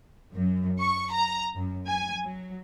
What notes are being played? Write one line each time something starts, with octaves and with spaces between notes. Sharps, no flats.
F#2
C#6
A#5
F#2
G#5
F#3